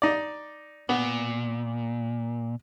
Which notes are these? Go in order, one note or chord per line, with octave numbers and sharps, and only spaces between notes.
D#4 D5
A#2 B3